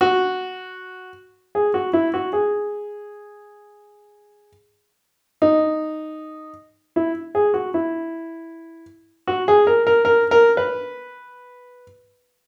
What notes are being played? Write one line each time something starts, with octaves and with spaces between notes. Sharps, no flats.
F#4
G#4
F#4
E4
F#4
G#4
D#4
E4
G#4
F#4
E4
F#4
G#4
A#4
A#4
A#4
A#4
B4